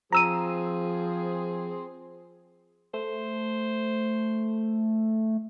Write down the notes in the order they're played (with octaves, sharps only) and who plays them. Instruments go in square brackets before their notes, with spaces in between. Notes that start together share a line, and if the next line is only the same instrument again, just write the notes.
[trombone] F3 [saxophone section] C4 G#4 [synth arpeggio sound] A#5 E6 D#7
[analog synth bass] A3 [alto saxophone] C5